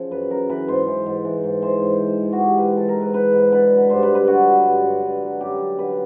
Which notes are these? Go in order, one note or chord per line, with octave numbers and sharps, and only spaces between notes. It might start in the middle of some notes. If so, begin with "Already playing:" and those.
Already playing: C#3 F3
F#2 B4
F#2 A#4
E3 B4
G#2 C5
E3
G#2
E3
G#2
E3 C5
G#2
E3
G#2
F#4
E3 G4
G#2 B4
E3 A4
A#4
G#2
B4
E3 B4
G#2
D3 B4
F#3
G2 C5
B4
G2
B4
D3 F#4
F#3
G2
G2
D3
F#3
F#2 G4
F#2
D3 B4